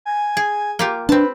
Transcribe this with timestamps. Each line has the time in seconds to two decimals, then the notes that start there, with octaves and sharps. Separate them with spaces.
0.05 G#5
0.37 G#4
0.79 A#3 F4 G4
1.09 C4 D4 B4 A5